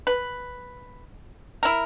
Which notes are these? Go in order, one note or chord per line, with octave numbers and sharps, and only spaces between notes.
B4
E4 A#4